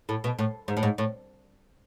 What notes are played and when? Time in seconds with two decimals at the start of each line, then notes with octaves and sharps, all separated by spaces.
0.09 A2
0.24 B2
0.39 A2
0.68 G#2
0.77 A2
0.83 G#2
0.98 A2